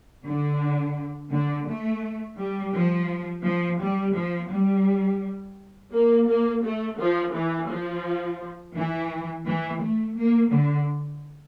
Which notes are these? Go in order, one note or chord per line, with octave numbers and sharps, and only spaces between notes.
D3
D3
A3
G3
F3
F3
G3
F3
G3
A#3
A#3
A3
F3
E3
F3
E3
E3
A3
A#3
D3